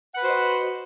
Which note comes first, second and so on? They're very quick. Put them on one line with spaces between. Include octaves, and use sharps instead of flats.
F#5 B4 F#4 C5 D#5